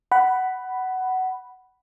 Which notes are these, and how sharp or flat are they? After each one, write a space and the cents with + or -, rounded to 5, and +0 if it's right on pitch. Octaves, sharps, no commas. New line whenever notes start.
F#5 +15 B5 +0